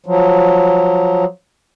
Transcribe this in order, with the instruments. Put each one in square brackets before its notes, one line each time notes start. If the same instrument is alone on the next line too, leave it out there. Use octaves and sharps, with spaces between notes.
[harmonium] F3 F#3